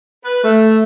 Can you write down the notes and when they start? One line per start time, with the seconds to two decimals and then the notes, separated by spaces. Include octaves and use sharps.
0.24 B4
0.43 A3